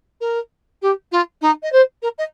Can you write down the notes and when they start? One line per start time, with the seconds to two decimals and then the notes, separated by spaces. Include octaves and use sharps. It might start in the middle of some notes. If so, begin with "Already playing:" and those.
0.21 A#4
0.82 G4
1.12 F4
1.41 D#4
1.63 D#5
1.72 C5
2.02 A#4
2.18 D#5